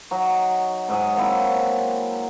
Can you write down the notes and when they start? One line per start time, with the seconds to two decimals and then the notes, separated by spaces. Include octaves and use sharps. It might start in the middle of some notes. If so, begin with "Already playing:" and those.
0.11 F#3 D#4 F#4
0.89 G#2 F#3 D#5 G#5
1.16 F#3 A#3 C4 E4